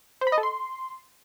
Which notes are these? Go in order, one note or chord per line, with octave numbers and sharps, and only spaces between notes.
C5
B5
D#5
A4
C6